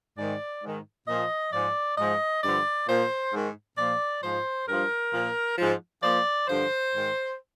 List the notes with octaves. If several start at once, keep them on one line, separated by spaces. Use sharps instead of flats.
G#2 D#3 D5
G#2 D#3
A#2 F3 D#5
G#2 F3 D5
G#2 F3 D#5
G2 D3 F3 D5
A#2 F3 C5
G#2 D#3
A#2 F3 D5
G#2 F3 C5
G2 F3 A#4
A#2 F3
G#2 F3
A#2 F3 D5
G2 D3 F3 C5
G#2 D#3